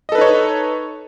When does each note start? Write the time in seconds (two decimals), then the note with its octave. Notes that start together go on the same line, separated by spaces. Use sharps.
0.09 D#5
0.12 A4
0.15 B4
0.18 D#4
0.21 C#5